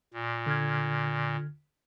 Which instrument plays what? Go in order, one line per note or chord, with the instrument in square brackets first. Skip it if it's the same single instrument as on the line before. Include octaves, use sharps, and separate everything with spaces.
[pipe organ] A#2
[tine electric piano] D3 F6 G#6